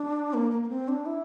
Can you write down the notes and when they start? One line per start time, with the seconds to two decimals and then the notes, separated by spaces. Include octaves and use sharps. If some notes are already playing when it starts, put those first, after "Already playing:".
Already playing: D4
0.34 A#3
0.51 A#3
0.63 A#3
0.69 C4
0.88 D4
1.06 E4